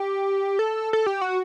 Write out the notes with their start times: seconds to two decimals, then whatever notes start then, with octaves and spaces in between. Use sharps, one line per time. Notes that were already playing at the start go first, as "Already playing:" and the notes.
Already playing: G4
0.59 A4
0.93 A4
1.06 G4
1.21 F#4